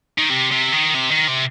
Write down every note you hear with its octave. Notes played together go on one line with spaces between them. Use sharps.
D#3
C3
C3
D#3
C3
D#3
C3